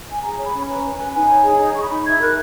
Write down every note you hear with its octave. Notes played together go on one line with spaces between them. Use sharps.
G#5
G#4 A#5
C#5
B5
C#4
B4 A#5
B4
G#5
B4
D#4 G#5
C#5
G#4
D#4 A#5
D#4 C#6
B5
D#4
E4 G#6
A#4 F#6